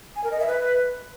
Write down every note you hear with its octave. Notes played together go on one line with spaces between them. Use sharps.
G#5
A#4
D#5
E5
B4